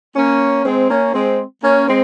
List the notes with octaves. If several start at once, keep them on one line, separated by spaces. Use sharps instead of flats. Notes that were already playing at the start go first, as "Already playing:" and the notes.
A#3 C#4
G#3 C4
A#3 C#4
G#3 C4
A#3 C#4
G#3 C4